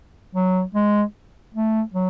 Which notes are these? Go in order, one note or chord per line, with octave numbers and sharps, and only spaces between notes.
F#3
G#3
A3
F#3